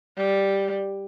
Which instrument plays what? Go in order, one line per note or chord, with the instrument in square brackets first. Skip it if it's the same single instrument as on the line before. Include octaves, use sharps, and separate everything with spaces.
[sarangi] G3